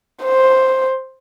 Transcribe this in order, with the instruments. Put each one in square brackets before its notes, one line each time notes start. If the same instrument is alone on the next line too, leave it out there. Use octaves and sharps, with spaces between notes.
[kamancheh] C5